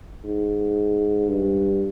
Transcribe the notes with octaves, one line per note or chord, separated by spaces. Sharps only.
G#2
G2